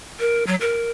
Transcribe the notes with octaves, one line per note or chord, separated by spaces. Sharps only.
A#4
F#3
A#4